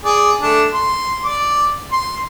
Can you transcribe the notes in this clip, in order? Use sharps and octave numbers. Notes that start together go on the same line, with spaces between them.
G#4 D5
A3 D4 A5
C6
D5 D6
C6